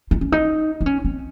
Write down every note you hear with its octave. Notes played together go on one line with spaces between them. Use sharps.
D#4
C#4
D#4
D#4
C#4
C4